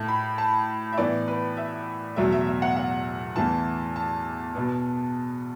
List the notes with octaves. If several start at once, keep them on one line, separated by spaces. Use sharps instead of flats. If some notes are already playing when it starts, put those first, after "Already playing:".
Already playing: A2 A3 A5
B5
A5
E5
A2 E3 B3 D5
B4
E5
E2 B2 F#3 A3 E5
E5
E5
F#5
F#5
E2 E3 A3 A5
A5
B2 B3